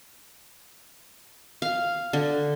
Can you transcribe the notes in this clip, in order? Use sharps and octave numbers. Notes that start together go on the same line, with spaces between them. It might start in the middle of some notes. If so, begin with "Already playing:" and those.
F5
D3